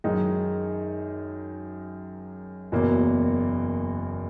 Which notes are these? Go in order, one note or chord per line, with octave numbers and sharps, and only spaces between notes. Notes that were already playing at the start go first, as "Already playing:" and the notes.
F#2 D#3 G#3 D#4
F#1 E2 B2 F#3 A#3